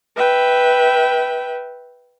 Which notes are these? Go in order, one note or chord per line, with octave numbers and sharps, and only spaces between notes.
B4 E5 G5